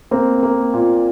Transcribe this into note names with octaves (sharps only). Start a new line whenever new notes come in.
A#3 C4
A#3
A#2